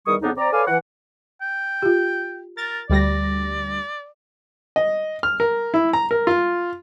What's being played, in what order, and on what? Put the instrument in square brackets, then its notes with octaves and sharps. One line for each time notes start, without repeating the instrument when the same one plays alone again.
[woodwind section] E2 D#3 G3 C#6 D#6
F2 C#3 B3 D4 D#4
C4 D5 A#5
A4 B4 C#5 D5 F5 G#5
E3 F#5
[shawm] G5
[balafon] F4 G4
[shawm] A#4 [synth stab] A6
[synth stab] D2 G3 A#6 [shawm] D5
[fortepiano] D#5
F6
A#4
E4
A#5
A#4
F4